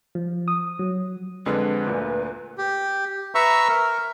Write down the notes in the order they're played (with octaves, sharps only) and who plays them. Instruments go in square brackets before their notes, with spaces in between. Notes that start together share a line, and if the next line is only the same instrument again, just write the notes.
[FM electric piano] F3
D#6
F#3
[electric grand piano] F2 D3 G#3 [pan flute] B4
[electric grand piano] D2 A#2
[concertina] G4
B4 E5 A#5 C#6 E6
A#4